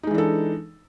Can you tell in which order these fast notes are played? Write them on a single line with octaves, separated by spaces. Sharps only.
D#4 G#3 E3 D4 A4